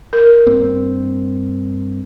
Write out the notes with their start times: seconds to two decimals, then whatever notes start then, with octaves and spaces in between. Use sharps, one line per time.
0.13 A#4
0.47 G2 A#3 C4